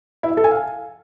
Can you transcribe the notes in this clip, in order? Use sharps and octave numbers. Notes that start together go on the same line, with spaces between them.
E4
E5
A4
G#5
F5